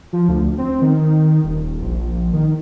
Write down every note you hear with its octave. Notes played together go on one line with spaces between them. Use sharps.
F3
D2
C4
D#3
D#1
A#1
A#1
D#3